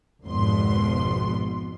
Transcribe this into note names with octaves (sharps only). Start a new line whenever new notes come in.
G#1 F2 B2 C6